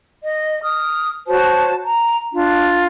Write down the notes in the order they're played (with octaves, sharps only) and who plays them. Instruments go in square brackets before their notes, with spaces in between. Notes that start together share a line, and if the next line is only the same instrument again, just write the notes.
[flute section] D#5
D#6 F6
F#4 C5 C#5 A5
A#5
D4 F4